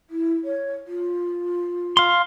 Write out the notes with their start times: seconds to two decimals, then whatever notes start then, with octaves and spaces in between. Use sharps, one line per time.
0.10 E4
0.44 C#5
0.87 F4
1.97 F5 C6